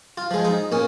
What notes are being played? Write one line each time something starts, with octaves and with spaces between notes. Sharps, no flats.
F4
F3 G#3
D#4
A#2 C#4